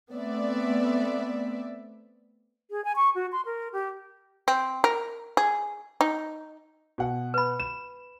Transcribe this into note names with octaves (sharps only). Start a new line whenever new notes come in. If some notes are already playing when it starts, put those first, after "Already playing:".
A3 B3 C4 D5 E5
G#4
G#5
C#6
F#4
C6
A#4
G4
C4
A#4
G#4
D#4
B2 F#5
B4 B5
E7